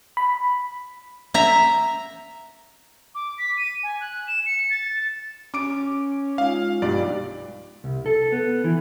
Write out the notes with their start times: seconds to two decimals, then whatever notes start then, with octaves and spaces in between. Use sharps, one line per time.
0.17 B5
1.34 E5 A#5
3.15 D6
3.38 B6
3.57 D#7
3.83 G#5
4.01 F#6
4.27 E7
4.46 C#7
4.70 A6
5.54 C#4 D6 D7
6.38 G#3 D#4 F4 F5
6.82 B1 G2 D5
7.84 C2
8.06 A4
8.32 B3
8.64 E3